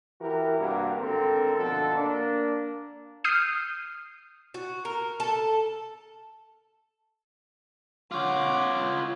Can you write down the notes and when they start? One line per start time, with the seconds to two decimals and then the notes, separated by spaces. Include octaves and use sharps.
0.20 E3 F#4 G4 A#4
0.58 G2 C3 A#3 F#4 G4
0.97 G#1 D3 C4 A4 A#4
1.56 B2 D3 F3 F#4 A4
1.95 A#3 D4
3.24 D#6 F6 G6 C7 D#7
4.54 F#4
4.85 A#4
5.20 A4
8.12 F4 C#5 F#5 D6